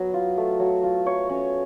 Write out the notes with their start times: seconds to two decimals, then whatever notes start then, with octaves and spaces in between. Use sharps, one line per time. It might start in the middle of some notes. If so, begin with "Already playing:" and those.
Already playing: F#3 B3
0.14 F4
0.38 A3
0.60 F#3
0.83 F4
1.06 F#3 C#5
1.29 C#4